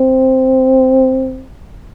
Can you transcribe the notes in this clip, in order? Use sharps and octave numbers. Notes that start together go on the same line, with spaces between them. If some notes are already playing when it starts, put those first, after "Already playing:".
Already playing: C4